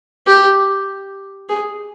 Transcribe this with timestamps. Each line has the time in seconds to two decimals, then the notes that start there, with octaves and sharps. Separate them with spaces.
0.27 G4
1.49 G#4